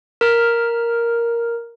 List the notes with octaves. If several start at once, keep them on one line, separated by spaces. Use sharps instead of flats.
A#4 F6